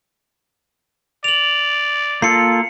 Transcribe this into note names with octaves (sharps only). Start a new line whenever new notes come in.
D5 F7 F#7
A#3 F4 A4 C7 C#7